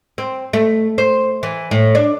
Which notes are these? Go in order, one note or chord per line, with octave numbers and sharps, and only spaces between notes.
C4
A3
C5
E3
A2
D4